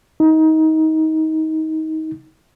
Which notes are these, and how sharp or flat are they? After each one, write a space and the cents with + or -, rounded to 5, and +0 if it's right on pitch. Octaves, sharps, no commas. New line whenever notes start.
D#4 +25